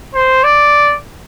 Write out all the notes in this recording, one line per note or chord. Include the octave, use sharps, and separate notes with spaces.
C5
D5